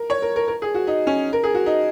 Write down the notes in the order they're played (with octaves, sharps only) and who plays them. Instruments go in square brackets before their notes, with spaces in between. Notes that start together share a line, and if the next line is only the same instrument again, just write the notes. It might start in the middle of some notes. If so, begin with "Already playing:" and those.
Already playing: [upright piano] A#4
C#5
A#4
A#4
A#4
G#4
F#4
D#4
C#4
A#4
G#4
F#4
D#4